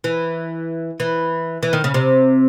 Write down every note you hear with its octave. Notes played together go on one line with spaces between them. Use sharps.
E3
E3
E3
D#3
C#3
C3